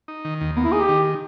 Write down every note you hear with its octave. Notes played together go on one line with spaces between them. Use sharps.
D#4
D#3
D#2
A#3 B3
E4
D#4 G#4
G4
D#3